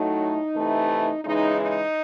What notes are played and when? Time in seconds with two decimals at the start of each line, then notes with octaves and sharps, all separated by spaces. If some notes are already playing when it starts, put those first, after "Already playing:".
Already playing: A2 F#3 A3 D#4
0.54 C3 E3 A3
1.24 C#3 E3 G#3 D#4
1.60 D#4